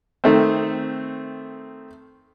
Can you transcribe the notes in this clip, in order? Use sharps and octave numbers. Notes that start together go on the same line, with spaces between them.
D#3 A3 C4